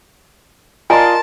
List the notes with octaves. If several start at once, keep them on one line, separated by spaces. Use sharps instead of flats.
F4 A#4 D5 D#5 G#5 A5 C6